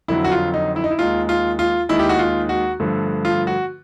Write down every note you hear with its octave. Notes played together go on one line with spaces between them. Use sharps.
F2 D3 F#3 E4
F#4
F4
D#4
E4
D#4
E4
D#2 D#3 G#3 F4
F4
F4
D#2 D#3 G#3 E4
G4
F#4
F4
F#4
G2 D3 F3 A3
F4
F#4